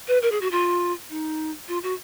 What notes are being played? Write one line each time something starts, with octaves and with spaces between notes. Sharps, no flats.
B4
A#4
G#4
F#4
F4
D#4
F4
F#4